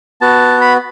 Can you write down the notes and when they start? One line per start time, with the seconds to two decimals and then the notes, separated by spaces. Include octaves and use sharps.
0.21 B3 F#4 A5
0.61 B5